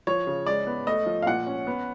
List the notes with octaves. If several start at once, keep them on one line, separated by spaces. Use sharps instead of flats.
F3 C#5
C#3
G#3 D5
B3
A3 D#5
F3
F5
A#2 F#5
C#4
B3